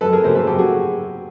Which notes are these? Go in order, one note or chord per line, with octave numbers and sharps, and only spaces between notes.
F#2 A4 B4
G#4 A#4
C#3 F#3 A#3 A#4 C5
A4 B4
F#2 G4 A4
F#4 G#4